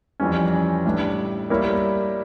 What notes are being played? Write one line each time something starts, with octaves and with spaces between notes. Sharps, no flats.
F2 E3 G3 C#4
A2 G3 D4
G3 A#3 E4 A#4 C#5